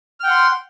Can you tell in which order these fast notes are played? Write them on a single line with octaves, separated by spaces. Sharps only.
F6 G5 F#5 C6